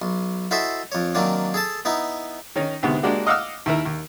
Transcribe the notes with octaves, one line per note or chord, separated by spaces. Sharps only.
B1
E4 F#4 A4 C5 D#5 E5
F2 C#5
D#3 F#3 A#3 C4 D4
G#4 A4 A5
B3 D#4 E4
D#3 C#4 D#4
D2 G#2 C3 B3
G#3 A#3 D4 F#4 G4
D#5 F5 F#5 D6 E6 F6
D#2 E4 A#4
D#2